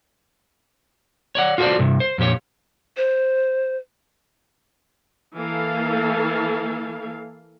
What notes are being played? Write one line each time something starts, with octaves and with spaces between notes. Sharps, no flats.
C#5 D5 F#5
F4 F#4 A4 A#4 C5 D5
G2 C3
C5
F2 A#2 G4 C#5
C5
E3 A#3 A4 F5